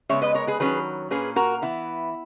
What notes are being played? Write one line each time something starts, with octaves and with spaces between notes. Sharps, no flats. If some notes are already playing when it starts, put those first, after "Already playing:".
C#3 G#3 B3 C#5 E5
B4 D#5
A#4 C#5
G#4 B4
D#3 F#3 C#4 G#4 B4
A#2 A#3 C#4 G#4 B4
F#4 A#4
E3 B3 E4